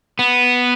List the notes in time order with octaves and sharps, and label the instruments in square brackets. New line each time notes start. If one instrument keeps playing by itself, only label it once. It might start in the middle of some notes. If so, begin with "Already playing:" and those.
[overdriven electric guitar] B3